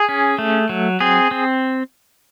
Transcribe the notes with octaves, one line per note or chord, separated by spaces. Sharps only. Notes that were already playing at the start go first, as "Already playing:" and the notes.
Already playing: G#4
C#4
A3
F#3
C4 G#4
C4